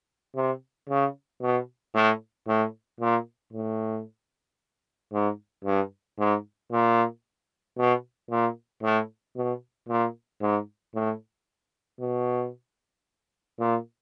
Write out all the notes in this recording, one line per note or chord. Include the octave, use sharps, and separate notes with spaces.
C3
C#3
B2
A2
A2
A#2
A2
G#2
G2
G#2
A#2
B2
A#2
A2
B2
A#2
G#2
A2
B2
A#2